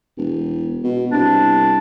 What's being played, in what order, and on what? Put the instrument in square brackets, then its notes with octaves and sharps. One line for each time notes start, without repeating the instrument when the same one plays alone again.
[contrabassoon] E1
B2
[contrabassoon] C2 [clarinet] D4